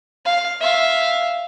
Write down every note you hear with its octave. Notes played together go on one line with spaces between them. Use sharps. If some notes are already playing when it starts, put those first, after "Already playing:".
F5
E5 F5